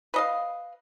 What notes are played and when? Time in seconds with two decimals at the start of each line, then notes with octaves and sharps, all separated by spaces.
0.14 B4 D#5 F5